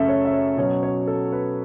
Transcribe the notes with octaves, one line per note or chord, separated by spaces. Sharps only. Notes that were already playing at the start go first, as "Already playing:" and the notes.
Already playing: F#2 C#3 A3 C#4 A4 E5
C#5
E5
C#5
B2 F#3 C#4 C#5
C#5
A4
B4